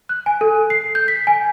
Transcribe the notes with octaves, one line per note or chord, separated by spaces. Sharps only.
F#6
G#5
A4
C7
G6
B6
G#5